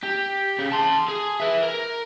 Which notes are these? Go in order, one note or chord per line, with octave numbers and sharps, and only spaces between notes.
G4
C#3
A5 C6
G#4
B4 E5
A#4